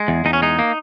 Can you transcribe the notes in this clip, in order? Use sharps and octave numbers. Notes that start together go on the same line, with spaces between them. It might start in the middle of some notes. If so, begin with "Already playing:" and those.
Already playing: G#3
E2
E2 D#4
C#4
G#3 D#4
A#3